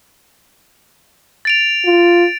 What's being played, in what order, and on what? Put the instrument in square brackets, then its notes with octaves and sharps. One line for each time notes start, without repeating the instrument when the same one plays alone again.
[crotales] A6 D7 F7
[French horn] F4